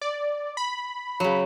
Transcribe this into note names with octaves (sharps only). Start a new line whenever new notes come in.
D5
B5
C#3 F#3